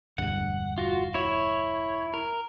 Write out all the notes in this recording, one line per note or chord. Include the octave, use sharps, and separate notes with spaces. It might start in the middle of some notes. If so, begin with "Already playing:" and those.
E1 D2 G2 F#5
F4 F#4
E4 C#5
A#4